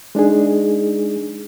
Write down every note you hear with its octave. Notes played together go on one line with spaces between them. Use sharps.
G#3 D4 D#4 G#4